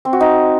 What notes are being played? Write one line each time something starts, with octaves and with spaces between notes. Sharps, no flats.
C4
F#4
D#4